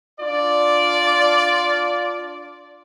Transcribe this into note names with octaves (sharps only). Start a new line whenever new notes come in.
D4 F4 D5